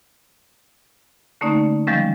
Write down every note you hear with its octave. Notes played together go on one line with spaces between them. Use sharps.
D3 A3 A#3 C#4 D#4 D5
D#3 F3 G3 G#3 C#4